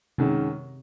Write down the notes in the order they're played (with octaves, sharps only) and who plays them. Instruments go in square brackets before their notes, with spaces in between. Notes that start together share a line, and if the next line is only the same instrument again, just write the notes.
[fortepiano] F#2 D#3 G#3 [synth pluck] C3